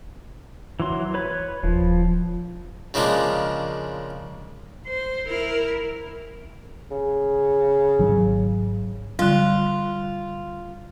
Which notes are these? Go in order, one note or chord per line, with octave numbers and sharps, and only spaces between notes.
E3 F#3 C6
B4 C#5 B5
D#1 F3
C#3 F3 G#3 A#3 D4
C5
E4 A#4
C#3
G#1 D#3 F#3
D3 G3 F4